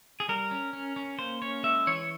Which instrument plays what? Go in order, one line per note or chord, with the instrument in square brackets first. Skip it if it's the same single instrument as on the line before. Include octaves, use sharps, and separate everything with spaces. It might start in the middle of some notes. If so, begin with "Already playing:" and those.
[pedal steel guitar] G#4
G3 A#4
C#4
C#4
C#4
A#3 C5
C#4 C#5
G#3 E5
E3 C#5